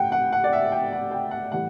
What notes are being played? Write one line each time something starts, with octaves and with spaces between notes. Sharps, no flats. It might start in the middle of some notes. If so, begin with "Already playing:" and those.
Already playing: A2 F#5 G5
F#5
F#5
D5
E5
G5
F#5
G5
F#5
A2 E3 G3 F#5